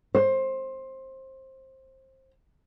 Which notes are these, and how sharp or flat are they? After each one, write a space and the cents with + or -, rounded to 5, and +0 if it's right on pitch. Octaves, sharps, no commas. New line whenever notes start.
C5 +20